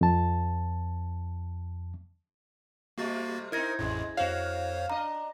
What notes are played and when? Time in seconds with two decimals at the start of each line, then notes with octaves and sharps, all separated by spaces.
0.01 F2 A5
2.98 C3 G3 A3 A#3 F#4 A6
3.52 C4 D#4 E4 A#4 G#6 A#6
3.79 A1 F2 A2 C#3 G#3
4.17 F2 F#4 C5 C#5 F5
4.90 D4 D#5 A#5